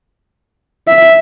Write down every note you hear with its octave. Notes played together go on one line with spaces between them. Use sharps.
E5